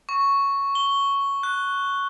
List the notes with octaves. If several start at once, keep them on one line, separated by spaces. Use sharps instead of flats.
C#6
G7
F#6